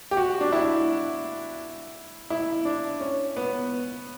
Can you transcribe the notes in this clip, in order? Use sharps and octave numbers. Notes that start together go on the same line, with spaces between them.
G4
F#4
D4
E4
E4
D4
C#4
B3